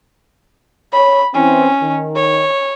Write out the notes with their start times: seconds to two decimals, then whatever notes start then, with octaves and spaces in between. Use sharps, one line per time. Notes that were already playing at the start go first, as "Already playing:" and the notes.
0.93 C#5 B5
1.34 E3 C4 C#4
1.81 D#3
2.16 C#5